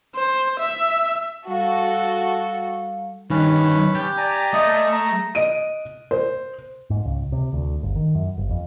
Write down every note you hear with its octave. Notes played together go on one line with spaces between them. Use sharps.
C5
E5
G3 F#4 A4 F5
G2 D#3 C#4 D#4 B4
G4 A5
D5 G#5 A#5
A3 D#5
A#5
D#5 D7 D#7
C5
G#2
C#2
C3
D2
G1
D#3
F#2
G1
F2